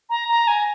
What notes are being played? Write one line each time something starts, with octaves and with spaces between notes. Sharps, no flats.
A#5
A#5
G#5